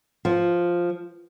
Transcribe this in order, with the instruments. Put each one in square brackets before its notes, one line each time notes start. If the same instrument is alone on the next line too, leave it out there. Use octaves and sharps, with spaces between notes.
[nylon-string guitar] F3